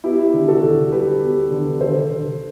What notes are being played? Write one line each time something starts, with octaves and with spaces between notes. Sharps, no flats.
B3 E4 G4
D3
F#4 A4
D3
G3 G4 B4
B3
D3
D3 A4 C5
D3